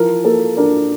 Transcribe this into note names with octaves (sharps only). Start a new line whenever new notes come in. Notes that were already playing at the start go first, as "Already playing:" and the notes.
Already playing: E3 F3 A#4
A#3 A4
D4 A#4